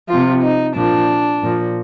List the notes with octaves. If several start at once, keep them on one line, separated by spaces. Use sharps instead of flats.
C3 F3 F4
D#4
A#2 F3 D4
A#2 F3